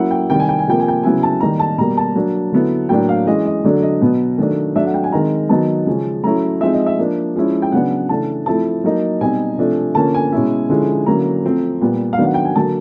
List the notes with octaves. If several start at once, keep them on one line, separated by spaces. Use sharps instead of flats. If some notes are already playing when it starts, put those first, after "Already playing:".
Already playing: F#3 A#3 C#4 E4 F#5
G5
C3 D#3 G3 G5
G#5
G5
G#5
C3 F3 A#3 G5
G#5
G5
C#3 F#3 B3 E4 G#5
A5
D#3 G3 A#3 D#4 A#5
A5
B2 G3 A#3 A#5
A5
F#3 A#3 D4
D3 F#3 B3 E4
A2 F#3 A#3 D4 G5
F5
E3 G#3 C#4 D#5
D#5
D3 F#3 A3 D4 D5
D#5
B2 F#3 B3
D#3 F#3 A3 D4
F#3 A3 D4 E5
F#5
G5
G#5
D#3 G#3 C4 D#4 A#5
D#3 F#3 B3 D#4 A5
C#3 F3 G#3 C#4
F#3 A3 C#4 E4 A#5
F3 G#3 C4 D#4 E5
D#5
E5
F3 A#3 D4
F3 G#3 C#4 E4
G5
C#3 F#3 B3 D4 F#5
C#3 E3 A3 D4 A5
F3 A3 C4 E4 A5
F#3 A#3 D#4
B2 G3 C4 D#4 G#5
C3 F3 A3 D4
D3 F3 A#3 C#4 A5
G#5
B2 G#3 C#4 E4
D3 F3 G#3 C#4 E4
D3 F#3 A#3 C#4 E4 A#5
F3 A3 C4
A#2 G3 B3
F5
D#3 F#3 B3 D4
F#5
G5
G#5
D3 F#3 A#3 A5